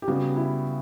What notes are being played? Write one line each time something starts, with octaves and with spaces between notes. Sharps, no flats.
G4
C#3 G3 B3 F#4
E4